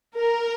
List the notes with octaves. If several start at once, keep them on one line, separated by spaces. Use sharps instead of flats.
A#4